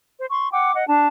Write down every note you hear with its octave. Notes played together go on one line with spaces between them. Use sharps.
C5
C6 C#6
F#5 G5 D6
D#5 F#5
D4 A5